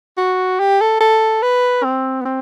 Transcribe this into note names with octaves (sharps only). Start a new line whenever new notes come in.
F#4
G4
A4
A4
B4
C4
B3
C4